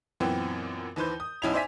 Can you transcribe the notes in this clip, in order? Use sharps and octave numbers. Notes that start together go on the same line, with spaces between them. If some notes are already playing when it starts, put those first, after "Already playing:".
F#2 A#2 E3 B3 C4
D#2 E3 B4 C5 G6
D#6
B1 C#4 E4 D#5 G#6 F7
C5 D5 E5 G#5 B6